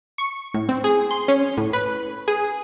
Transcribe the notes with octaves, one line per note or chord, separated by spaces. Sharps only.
C#6
A2
C4
G#4
C6
C#4
A2
B4
G#4